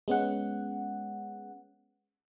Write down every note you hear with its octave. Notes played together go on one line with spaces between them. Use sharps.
G#3 B3 C#4 F#5